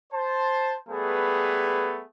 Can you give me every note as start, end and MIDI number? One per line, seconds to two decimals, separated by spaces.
0.13 0.77 72
0.13 0.77 81
0.89 2.04 55
0.89 2.04 57
0.89 2.04 59
0.89 2.04 68
0.89 2.04 71